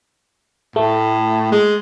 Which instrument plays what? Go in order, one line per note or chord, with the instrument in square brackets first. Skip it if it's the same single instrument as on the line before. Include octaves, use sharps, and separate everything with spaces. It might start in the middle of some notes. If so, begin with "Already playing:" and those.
[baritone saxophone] A2 [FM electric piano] A3
[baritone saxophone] G#3